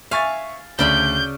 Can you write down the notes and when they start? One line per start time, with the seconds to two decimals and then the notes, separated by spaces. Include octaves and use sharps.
0.11 E5 F5 G#5 C#6 A6
0.79 D2 C#3 D5 B5 G6